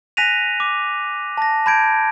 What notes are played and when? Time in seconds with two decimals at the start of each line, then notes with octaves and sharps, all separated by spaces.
0.17 G#5 F#6 A#6 B6 D#7 F7
0.60 D6
1.37 A5 A#6
1.66 A5 B5 G6 G#6 D7